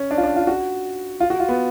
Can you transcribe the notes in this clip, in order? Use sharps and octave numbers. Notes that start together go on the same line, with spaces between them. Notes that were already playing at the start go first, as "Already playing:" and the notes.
Already playing: C#4
D4
F4
D4
F4
F#4
F4
F#4
F4
B3